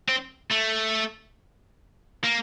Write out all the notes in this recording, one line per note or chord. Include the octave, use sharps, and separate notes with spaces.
C4
A3
A#3